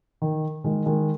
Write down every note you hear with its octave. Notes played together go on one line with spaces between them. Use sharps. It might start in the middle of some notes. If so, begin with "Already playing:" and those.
D#3
D#3 G#3
D#3 G#3